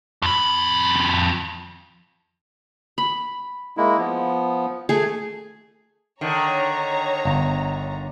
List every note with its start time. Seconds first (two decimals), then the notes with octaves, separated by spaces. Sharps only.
0.22 F2 B5
2.98 B5
3.77 G#3 A#3 E4
3.98 F3 B3
4.89 A3 G#4
6.21 D3 D#3 C#5 A#5
7.25 G1